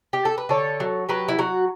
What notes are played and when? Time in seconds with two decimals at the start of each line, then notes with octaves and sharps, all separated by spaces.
0.13 G4
0.25 A4
0.38 B4
0.49 D3 A4 C#5
0.80 F#3
1.09 F#3 G4 B4
1.28 E4
1.39 F#3 F#4